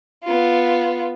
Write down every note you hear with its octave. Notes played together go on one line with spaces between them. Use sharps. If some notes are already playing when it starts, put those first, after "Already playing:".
B3 F4